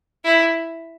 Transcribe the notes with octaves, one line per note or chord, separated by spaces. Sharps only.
E4